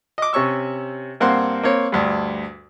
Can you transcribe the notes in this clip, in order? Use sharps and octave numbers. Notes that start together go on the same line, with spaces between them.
D#5 D6
C3 C#4 C#6 E6
G2 A#3 C4 F#5 C6
A#3 C4 C#5
D2 G2